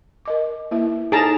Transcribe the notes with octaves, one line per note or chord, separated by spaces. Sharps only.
A#4 D#5 D6
A#3 E4 E5
D#4 G#4 A4 C5 A5 A#5